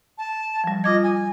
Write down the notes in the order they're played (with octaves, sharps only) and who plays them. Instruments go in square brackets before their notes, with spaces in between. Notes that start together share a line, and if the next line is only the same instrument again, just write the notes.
[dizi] A5
[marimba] F3 G3
[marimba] F4 D6 G#6 [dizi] D#5
[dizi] G#5